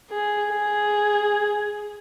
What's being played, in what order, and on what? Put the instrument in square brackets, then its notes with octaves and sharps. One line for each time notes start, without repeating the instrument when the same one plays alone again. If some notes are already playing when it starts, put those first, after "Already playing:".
[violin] G#4
G#4